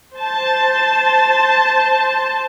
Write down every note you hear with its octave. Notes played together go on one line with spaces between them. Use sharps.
C5 A5